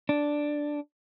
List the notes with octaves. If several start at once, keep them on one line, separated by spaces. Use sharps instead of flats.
D4